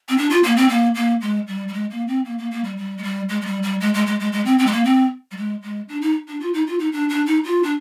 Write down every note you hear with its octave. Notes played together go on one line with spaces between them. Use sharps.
C4
D4
F4
A#3
C4
A#3
A#3
G#3
G3
G3
G#3
A#3
C4
A#3
A#3
A#3
G3
G3
G#3
G3
G#3
G#3
G3
G3
G#3
G#3
G#3
G#3
G#3
C4
C4
G#3
A#3
C4
G3
G#3
G#3
D4
D#4
D4
F4
D#4
F4
D#4
D4
D4
D#4
F4
D4